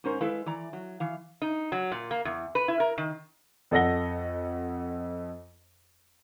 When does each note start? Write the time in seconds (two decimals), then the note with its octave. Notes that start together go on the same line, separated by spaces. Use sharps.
0.04 G#2 C#4 A#4 C5
0.21 G#3 E4 A4 B4 F5
0.46 E3 D5 A#5
0.73 F#3
1.00 E3 F5
1.42 D#4
1.72 F#3
1.92 A#2
2.11 A#3
2.25 E2
2.55 B4
2.68 E4
2.80 A#4
2.98 D#3
3.71 F2 A4 D#5 F#5 A#6 G7